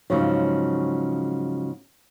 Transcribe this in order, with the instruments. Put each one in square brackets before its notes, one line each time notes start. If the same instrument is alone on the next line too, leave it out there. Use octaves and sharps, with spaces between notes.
[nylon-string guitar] G#2 C#3 F3 F#3